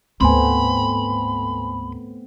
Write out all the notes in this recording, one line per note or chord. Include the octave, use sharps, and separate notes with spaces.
D2 G#2 A3 B3 C4 G#5 B5 C6